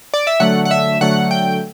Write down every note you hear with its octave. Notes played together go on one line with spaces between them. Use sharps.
D5
E5
D3 F#3 A3 F#5
F#5
E5
D3 F#3 A3 F#5
G5